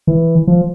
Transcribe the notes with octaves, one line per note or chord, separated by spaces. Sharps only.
E3
F3